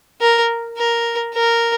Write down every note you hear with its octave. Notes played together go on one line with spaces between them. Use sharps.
A#4
A#4
A#4